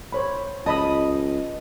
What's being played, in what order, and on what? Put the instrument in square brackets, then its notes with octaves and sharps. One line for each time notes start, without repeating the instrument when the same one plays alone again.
[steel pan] C5 C#5 B5
[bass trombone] C#2 [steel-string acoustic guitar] D#5 [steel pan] A5 B5 D#6